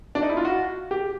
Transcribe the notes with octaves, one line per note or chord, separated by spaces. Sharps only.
D4
D#4
E4
F4
F#4
G4